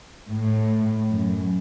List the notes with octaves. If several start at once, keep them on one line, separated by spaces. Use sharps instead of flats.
A2
F#2